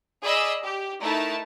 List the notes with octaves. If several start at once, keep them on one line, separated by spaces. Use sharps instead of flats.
G#4 D5 D#5 B5 E6
G4
A3 D#4 E4 A#4 A5